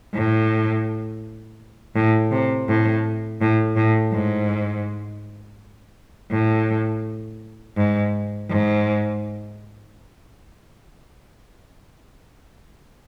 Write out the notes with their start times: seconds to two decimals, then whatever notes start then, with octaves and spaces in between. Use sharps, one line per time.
0.14 A2
1.95 A2
2.32 C3
2.68 A2
3.41 A2
3.77 A2
4.13 G#2
6.31 A2
7.77 G#2
8.50 G#2